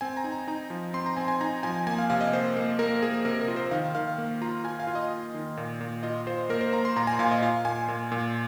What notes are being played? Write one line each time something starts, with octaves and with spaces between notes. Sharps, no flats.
C4 G#5
A#5
D#4
A#5
D#4 A#5
F3
C4 C6
A#5
C4 G#5
G#5
D#4 A#5
F3 G#5
A#3 G#5
F5
C3 F5
D#5
A#3 C5
A#3
A#3 A#4
A#3 G#4
C3 A#4
A#4
F4
C5
D#3 F5
D#3 F5
A#3
F4 A#5
F4 G#5
F5
F4
D#5
F4
D#3
A#2
A#2
F4 D#5
F4 C5
A#3 A#4
C5
A#3 A#5
C6
A#2 A#5
G#5
A#2 F5
D#5
F4 F5
A#2 G#5
A#2
A#2